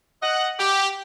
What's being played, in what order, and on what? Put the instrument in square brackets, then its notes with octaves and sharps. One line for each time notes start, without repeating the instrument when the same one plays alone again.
[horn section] D#5 F#5
G4